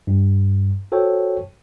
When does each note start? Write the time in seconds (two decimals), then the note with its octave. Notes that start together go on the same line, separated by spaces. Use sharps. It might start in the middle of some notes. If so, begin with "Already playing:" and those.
0.07 G2
0.92 F#4 A4 C5 C#5 G5